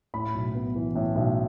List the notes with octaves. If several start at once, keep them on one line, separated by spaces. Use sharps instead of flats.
A2 B5
B1
B3
E3
A2
B1